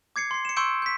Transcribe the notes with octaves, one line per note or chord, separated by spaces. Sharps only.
D6 G#6 C7 C#7
C6 C7
C#7 E7
C6 C#6 E6 G6 C#7 D7
G6 B6